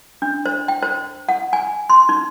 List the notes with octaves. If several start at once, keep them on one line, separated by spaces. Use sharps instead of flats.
D4
C5
G5
C5
F#5
G#5
C6
D#4